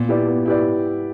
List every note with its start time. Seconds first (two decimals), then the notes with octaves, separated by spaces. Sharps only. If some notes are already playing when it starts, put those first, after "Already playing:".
Already playing: A#2 B3
0.08 E4 G4 B4 D5
0.27 B3
0.46 E4 G4 B4 D5